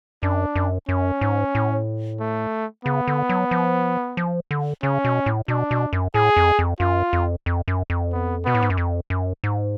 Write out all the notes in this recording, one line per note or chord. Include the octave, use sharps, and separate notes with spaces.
F#2 D4
F#2
F#2 C#4
G#2
A2
A3
C#3 B3
D3
F#3
F3
F3
D3
C#3 C#4
B2
A2
B2 D4
B2
F#2
A2 G#4
F2
F2
F#2 F4
F2
F2
F#2
F2
B3
B2 B3
A2
G#2
F#2
F2
F#2
G#2